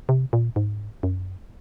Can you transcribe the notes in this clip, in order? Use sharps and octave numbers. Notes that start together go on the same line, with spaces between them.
C3
A#2
G#2
F#2